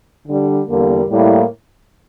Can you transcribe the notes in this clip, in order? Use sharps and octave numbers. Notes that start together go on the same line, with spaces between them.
D3 G3 D4
E2 D3 G3 A#3
A2 G3 A#3 E4